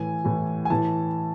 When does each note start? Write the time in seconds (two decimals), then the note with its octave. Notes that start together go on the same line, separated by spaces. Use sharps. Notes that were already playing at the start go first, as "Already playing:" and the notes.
Already playing: A2 E3 G#5
0.24 A2 E3
0.65 G#5
0.70 A2 E3 A5